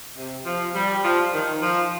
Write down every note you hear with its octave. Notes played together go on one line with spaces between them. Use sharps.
C3
F3
G3
F3
D#3
F3